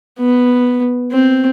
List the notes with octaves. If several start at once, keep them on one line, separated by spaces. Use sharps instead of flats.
B3
C4